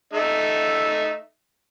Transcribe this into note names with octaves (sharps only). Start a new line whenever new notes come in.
A3 D#4 E5